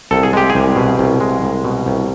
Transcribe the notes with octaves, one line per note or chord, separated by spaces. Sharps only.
C2 A4
G#4
G#3 G4
G#4
C2
B2
C2
G#3
C2
B2
C2